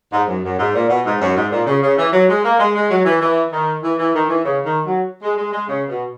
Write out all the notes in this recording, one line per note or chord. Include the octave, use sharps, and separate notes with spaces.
G#2
F#2
F#2
G#2
A#2
B2
G#2
F#2
G#2
A#2
C#3
C#3
E3
F#3
G#3
A#3
G#3
G#3
F#3
E3
E3
D#3
E3
E3
D#3
E3
C#3
D#3
F#3
G#3
G#3
G#3
C#3
B2